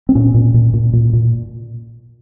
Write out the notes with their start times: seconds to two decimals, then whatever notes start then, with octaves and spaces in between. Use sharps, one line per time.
0.09 C4
0.15 A#2 C#4
0.34 A#2
0.54 A#2
0.74 A#2
0.93 A#2
1.13 A#2